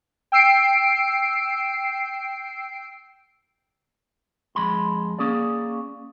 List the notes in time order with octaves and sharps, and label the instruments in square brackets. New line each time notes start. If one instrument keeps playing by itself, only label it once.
[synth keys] G5 E6 C7 D7
[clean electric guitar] F2 G#3 B5 C6
A#3 C#4 G#4 D5